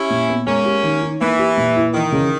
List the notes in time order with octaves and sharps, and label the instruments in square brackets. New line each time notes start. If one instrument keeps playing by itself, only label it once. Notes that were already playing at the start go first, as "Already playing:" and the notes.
Already playing: [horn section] C#4 E4 [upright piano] G4
[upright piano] A#2
B3
[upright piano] G#3 [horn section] A#3 C#4
[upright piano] G4
D#3
D#4
[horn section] E3 [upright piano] A#3
[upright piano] G4
A#2
E4
[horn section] D#3 [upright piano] E3
[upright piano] C#3